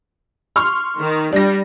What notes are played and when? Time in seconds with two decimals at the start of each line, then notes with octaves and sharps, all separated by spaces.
0.56 C6 C#6 F6
1.00 D#3
1.33 G3 D4 A#6